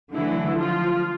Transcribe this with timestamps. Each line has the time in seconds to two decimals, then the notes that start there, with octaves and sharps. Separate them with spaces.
0.13 D3 E3 F#3 A3 E4
0.59 F3 F4